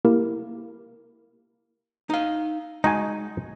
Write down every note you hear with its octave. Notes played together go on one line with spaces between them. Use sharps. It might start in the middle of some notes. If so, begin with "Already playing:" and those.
A#3 E4 G4 A#4
D#4 F5
G#3 D#4 F#4 G#5 A5